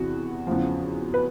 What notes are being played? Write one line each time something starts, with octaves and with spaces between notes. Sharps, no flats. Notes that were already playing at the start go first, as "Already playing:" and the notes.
Already playing: E2 C3 E3 F#4
E2 C#3 F3
B4